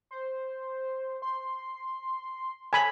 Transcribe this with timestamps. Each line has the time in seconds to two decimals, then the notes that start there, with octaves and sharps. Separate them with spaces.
0.11 C5
1.22 C6
2.73 A4 G#5 B5